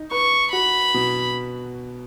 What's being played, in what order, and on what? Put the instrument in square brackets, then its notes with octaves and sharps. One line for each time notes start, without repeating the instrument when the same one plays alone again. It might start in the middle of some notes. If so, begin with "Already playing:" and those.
Already playing: [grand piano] D#4
[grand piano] B4 [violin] C#6
[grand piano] F#4 [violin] B5
[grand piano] B2